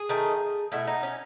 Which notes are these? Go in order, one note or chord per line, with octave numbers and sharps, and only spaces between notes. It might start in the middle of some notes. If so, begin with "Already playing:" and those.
Already playing: G#4
D#3 A3
B2 A3 E4
D#4
C#4